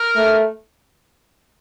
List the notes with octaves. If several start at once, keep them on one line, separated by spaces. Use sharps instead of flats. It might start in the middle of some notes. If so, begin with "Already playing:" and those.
Already playing: A#4
A3